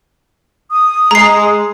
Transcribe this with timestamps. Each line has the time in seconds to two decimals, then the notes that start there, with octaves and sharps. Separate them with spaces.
0.71 D#6
1.11 G#3 A#5 C7